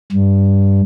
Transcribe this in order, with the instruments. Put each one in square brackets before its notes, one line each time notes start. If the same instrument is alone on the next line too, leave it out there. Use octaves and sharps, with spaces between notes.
[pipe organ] G2